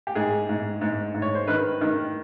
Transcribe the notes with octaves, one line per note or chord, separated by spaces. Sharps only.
G4
G#2 G#4
G#2
G#2
G#2
C#5
C5
D#3 B4
D#3